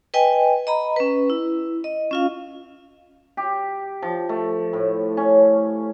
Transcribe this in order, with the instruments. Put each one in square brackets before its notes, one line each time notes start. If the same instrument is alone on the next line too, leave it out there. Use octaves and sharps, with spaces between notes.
[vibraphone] B4 D#5 G5 G#5
D#5 A#5 B5
C#4 B4
E4
D#5
C#4 F4 F5
[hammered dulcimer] G4
F3
A3
A2
C#4